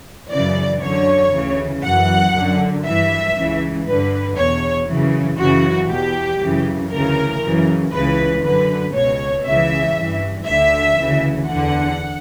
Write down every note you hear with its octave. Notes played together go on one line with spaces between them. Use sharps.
F#2 C#3 E3 D5
F#2 D3 C#5
D2 C#3 E3
F#2 E3 F#5
F#2 D3
G2 E3 E5
C#2 C#3 E3
G2 D3 B4
E2 B2 C#5
F#2 C#3 E3
F#2 C#3 E3 F#4
E2 B2 G4
F#2 C#3 E3
D2 C#3 E3 A#4
F#2 C#3 E3
C#2 C#3 E3 B4
F#2 D3 B4
C#2 B2 C#5
C#2 C#3 E3 E5
G2 E3
D2 D3 E5
D2 C#3 E3
E2 D3 F#5